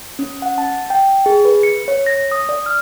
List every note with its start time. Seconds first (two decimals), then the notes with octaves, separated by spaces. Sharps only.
0.19 C#4
0.42 F#5
0.58 A5
0.90 G5
1.26 G#4
1.45 B4
1.63 C#7
1.88 C#5
2.06 A#6
2.32 D#6
2.49 D5
2.66 F6